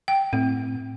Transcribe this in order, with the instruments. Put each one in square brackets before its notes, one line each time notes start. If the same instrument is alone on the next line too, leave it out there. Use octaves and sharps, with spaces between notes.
[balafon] G5
[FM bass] A2 [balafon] C4